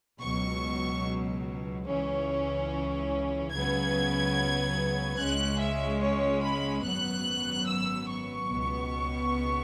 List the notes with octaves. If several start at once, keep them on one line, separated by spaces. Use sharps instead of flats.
C#2 B2 F#3 C#6
C#2 C#3 E3 C#4
C#2 C#3 F#3 B3 G#6
C#2 C#3 G#3 C#4 F#6
E5
C#5
B5
G#1 F#2 F#3 B3 F#6
E6
C#6
C#2 B2 B3